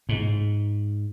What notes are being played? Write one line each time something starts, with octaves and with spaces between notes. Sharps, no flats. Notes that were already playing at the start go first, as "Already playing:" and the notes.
G#2